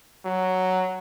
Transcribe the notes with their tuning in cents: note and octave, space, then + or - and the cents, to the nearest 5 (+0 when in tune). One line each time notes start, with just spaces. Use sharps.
F#3 +5